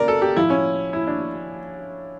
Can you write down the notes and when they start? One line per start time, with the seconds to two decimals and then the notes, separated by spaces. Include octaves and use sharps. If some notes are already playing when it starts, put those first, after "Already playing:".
Already playing: C#3 A#4 D5
0.08 A4
0.22 G4
0.36 A2 F3 E4
0.50 C#4
0.93 E4
1.07 D4